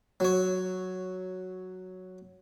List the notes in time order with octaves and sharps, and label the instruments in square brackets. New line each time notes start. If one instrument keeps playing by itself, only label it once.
[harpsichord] F#3 C#5